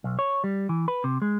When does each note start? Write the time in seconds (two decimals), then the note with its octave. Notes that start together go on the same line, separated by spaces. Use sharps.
0.04 B1
0.19 C#5
0.44 G3
0.69 E3
0.88 B4
1.04 C3
1.22 G#3